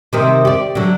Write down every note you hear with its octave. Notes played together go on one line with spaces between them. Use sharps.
C3 D#3 C4
G4 D5
D3 F#3